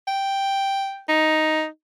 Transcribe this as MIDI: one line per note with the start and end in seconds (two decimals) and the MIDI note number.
0.07 1.00 79
1.08 1.66 63